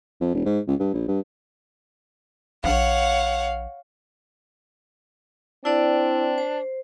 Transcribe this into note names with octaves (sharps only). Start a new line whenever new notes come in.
F2
E1
G#2
C#2
G2
A#1
G2
A#1 C#5 F5 F#5
C4 D4 E4 D5
C5